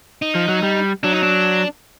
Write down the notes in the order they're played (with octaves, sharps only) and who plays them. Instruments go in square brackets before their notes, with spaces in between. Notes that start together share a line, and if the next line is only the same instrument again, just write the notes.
[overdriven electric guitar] D#4
[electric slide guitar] F3
F#3
G3
[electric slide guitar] F#3 [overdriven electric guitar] D4
[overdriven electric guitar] D#4
D4